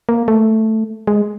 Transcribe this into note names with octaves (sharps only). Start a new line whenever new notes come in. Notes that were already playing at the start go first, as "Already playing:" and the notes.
A#3
A3
G#3